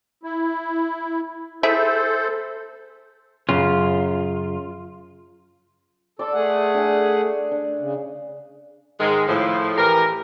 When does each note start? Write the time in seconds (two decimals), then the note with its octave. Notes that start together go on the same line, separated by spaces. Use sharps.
0.23 E4
1.63 E4 G#4 A4 C5 E5
3.49 F#2 C#3 F4
6.19 A4 D5 C6 D6
6.33 A3 G#4 F#5
6.74 D4 E5 G#5
7.51 D4
7.79 C#3
9.00 G#2 D#3 G#3
9.28 A2 F3
9.77 E3 G4 A#4